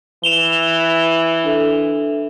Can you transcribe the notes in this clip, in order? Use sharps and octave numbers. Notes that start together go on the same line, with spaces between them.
E3 E7 F7 G7
D4 A4 E5